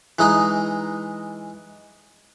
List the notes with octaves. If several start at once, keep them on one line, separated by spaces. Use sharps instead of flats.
E3 G#3 D#4 D#5